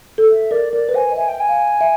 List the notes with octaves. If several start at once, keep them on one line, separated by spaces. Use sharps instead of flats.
A4
E5
A#4 D5
A#4 D5
B4
C5 G#5
D#5
E5 G#5
G5
G#5
F5
E5